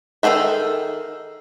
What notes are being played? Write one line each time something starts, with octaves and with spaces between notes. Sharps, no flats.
D#3 F#3 G#4 A4 E5